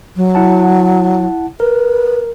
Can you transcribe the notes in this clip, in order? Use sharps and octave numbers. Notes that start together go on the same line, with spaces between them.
F#3
E4 F#5 A5
A#4 B4